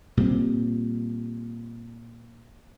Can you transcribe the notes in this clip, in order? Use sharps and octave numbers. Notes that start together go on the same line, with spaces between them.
A#2 G3 C4